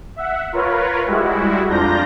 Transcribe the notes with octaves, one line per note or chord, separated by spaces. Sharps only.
E5 F#5
F4 A#4 B4 C#5
G3 G#3 E4 F#4
F2 D4 F4 A#5 G6 A#6